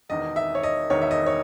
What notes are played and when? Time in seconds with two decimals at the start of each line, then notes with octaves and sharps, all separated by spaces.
0.09 E1 E2 D#3 D#5
0.36 E5
0.55 C#5
0.63 D#5
0.90 E1 E2 D#3 C#5
1.01 E5
1.11 D#5
1.26 C#5